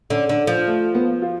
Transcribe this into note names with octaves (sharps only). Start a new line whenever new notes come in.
D3 C#4
D3
F3
A3
B3
F4